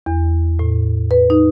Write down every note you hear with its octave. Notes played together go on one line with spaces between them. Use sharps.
E2
A2
B4
D#4